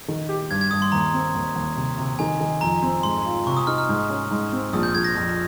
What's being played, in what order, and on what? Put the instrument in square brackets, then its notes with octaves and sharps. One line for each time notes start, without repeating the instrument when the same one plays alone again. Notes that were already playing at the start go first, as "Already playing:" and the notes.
[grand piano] D#3
G4
[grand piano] G2 [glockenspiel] G#6
[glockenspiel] G#6
[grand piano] G2 [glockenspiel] D#6
[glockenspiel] C6
[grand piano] D#2 [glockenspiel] A#5
[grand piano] C4
D#2
D#2
C3
C3
[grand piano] D#3 [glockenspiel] G#5
[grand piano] D#3
[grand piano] F2 [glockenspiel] A#5
[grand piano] C4
[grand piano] G#2 [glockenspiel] C6
[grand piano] F4
[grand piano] C3 [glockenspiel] C#6
[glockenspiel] D#6
[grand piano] D#4 [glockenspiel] F6
[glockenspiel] F6
[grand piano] G#2
C#4
G#2
C4
[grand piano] A#1 [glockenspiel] D#6
[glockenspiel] G6
[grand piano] A#1 [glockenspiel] G#6
[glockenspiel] A#6
[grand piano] F2